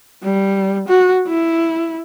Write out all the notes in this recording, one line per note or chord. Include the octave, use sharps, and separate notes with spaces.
G3
F#4
E4